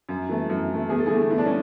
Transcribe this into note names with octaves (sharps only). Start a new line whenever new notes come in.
F#2
E3 A3
F#2
E3 A3
E2 G#4
A4
E4 G#4
D3 A3
E2 E4
D4
C#4